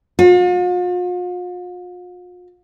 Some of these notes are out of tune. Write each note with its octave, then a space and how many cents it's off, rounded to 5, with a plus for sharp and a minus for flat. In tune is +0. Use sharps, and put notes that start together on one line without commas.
F4 +45